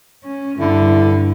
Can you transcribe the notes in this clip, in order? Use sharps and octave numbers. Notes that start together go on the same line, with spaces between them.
C#4
G2 D3 E4